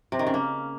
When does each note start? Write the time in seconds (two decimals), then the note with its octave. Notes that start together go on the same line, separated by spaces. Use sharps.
0.12 C3
0.19 D#3
0.27 C#3
0.34 A#3